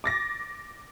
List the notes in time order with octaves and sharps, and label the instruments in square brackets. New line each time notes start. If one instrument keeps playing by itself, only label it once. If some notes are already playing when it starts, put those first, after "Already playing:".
[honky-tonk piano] D6 A6 A#6